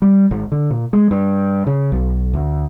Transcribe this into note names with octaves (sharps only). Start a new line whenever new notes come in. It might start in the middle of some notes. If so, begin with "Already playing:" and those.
G3
G#1
D3
A#2
G#3
G2
C#3
B1
D2